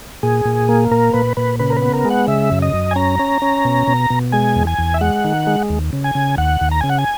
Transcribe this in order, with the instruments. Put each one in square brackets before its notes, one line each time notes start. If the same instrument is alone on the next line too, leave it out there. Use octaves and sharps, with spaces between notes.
[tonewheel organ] A#2 G#4
A#2
A#3
A#2 A#4
A#2 B4
A#2 B4
C#3 B4
A#4
B4
B3
A#4
G#3
F#5
C#3 E5
F#2
D#5
F#2
G#5
C#4 A#5
C#4
C#4
B2
B2
B2
G#3 G#5
E2
G#5
E2
E5
G#3 F#5
D#3
G#3
D#2
C#3
G#5
C#3
D#2 F#5
D#2
A#5
C#3 G#5
F#5
G#5